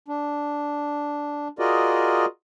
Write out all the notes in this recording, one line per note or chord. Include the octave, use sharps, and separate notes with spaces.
D4
F4 F#4 G#4 A#4 D5 D#5